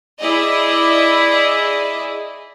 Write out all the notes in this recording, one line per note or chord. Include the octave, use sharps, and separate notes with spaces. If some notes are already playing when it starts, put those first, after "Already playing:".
E4 G#4 D5 D#5